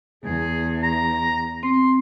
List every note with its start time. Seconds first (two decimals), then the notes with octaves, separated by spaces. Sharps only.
0.24 E2 G#4
0.83 A#5
1.63 C4 C6